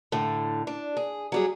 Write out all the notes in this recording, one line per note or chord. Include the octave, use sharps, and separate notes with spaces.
A2 D3
D4
G#4
F#3 G3 G#4